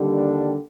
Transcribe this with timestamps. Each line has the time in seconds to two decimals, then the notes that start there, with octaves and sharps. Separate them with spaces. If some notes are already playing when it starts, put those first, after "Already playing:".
Already playing: D#2 D3 G3
0.14 D4